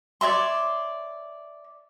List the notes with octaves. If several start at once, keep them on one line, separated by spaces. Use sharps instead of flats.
C#5 D5 E5 C6